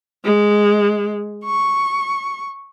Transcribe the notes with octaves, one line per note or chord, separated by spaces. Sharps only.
G#3
C#6